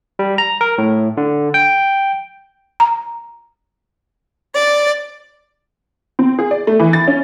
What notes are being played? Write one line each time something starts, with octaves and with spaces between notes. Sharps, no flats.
G3
A#5
A#4
A2
D3
G5
A#5
D5
C4
G#4
D5
A3
E3
A6
C#4